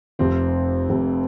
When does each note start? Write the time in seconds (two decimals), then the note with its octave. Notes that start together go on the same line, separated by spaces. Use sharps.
0.19 F1 F2 C3 C4
0.89 F1 F2 C3